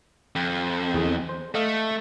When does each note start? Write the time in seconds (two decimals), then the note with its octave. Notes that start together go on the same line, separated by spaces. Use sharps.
0.36 F2
0.94 E2 G#4
1.29 C5
1.55 A3 A4 D#5 F5